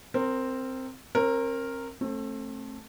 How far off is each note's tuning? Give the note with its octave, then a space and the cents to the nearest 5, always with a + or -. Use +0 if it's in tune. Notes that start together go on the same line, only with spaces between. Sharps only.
C4 +0 A#4 -20
C4 +40 A#4 -5
A3 +0 C4 +35